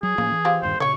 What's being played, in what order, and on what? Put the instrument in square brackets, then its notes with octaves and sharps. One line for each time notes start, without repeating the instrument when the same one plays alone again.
[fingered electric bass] F#3 [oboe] G#4
[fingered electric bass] A2 F3 A#3 [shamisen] C#3
[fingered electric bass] E3
[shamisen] C4 F4 G4
[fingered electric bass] D#1 G2 D#3 [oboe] C5
[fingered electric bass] A#2 C#3 [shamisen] C#5 G5 [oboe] C#6